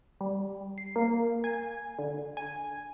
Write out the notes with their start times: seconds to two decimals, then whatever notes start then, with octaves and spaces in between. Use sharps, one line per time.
0.21 G3
0.78 C7
0.96 A#3
1.44 G#5
1.99 D3
2.37 G#5